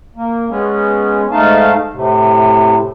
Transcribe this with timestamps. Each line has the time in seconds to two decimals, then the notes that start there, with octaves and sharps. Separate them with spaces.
0.16 A#3
0.49 G#3 B3 C#4
1.31 G#2 A3 D#4 F5 A5
1.93 A2 C3